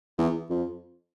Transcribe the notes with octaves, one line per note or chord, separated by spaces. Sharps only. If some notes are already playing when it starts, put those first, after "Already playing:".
E2
F2